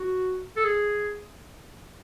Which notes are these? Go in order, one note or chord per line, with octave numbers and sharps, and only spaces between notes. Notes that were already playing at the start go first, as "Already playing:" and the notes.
Already playing: F#4
A4
G#4